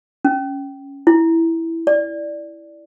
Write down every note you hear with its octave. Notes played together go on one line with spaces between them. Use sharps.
C#4
E4
D5